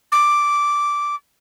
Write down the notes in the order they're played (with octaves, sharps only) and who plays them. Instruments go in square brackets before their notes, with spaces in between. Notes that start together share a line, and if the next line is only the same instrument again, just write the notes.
[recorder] D6